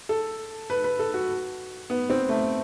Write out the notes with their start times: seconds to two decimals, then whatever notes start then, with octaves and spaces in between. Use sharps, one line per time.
0.09 A4
0.70 B4
0.84 B4
0.99 A4
1.14 F#4
1.90 B3
2.10 C4
2.29 A3